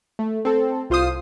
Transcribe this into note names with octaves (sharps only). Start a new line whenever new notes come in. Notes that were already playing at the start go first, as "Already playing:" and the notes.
A3
C4 A4
C2 F4 C5 F5 D#6 C7